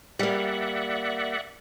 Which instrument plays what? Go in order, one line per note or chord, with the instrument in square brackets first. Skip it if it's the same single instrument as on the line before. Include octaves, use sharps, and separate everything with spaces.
[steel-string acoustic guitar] G3 A#3 [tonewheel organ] D5 E5 F#5